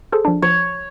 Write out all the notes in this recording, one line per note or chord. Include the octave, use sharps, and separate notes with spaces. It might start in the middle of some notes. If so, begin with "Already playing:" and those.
G#4 A4 C5
F3 D4
F3 C#5